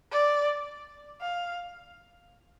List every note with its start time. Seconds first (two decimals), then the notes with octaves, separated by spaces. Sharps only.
0.12 D5
1.22 F5